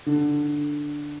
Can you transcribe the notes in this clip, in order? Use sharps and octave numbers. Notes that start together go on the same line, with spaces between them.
D3